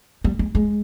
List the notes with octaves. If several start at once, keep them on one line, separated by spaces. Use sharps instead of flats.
G3
G#3
G#3